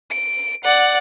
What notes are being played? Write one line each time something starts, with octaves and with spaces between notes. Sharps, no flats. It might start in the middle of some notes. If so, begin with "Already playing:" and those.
D7
D5 F#5